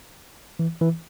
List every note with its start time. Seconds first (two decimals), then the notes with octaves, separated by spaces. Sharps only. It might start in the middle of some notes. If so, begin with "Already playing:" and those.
0.59 E3
0.81 E3